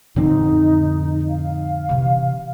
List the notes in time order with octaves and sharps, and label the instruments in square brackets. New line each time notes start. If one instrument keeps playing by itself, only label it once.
[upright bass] F2 [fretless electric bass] A2 D3 C4 [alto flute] D#4
[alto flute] F5
[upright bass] C3 E3